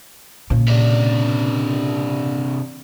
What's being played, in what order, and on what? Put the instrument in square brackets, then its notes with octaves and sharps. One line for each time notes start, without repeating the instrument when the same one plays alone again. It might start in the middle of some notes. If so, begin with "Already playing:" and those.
[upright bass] A#2 C#3
[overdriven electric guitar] C3 D4